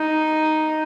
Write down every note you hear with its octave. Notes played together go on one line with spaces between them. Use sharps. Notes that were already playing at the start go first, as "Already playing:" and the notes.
Already playing: D#4